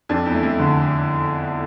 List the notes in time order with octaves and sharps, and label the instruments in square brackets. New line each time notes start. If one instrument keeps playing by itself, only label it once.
[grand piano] F2 [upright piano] D4
[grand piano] E2
[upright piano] A3
[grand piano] F2
[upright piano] D3